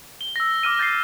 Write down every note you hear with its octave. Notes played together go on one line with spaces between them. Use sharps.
G7
E6 A#6
D6 F6 D#7
G6 A6 A#6 C7